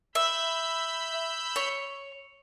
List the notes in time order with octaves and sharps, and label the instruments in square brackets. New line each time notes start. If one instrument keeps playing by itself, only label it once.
[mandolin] E5 [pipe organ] B5 E6 G6
[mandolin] C#5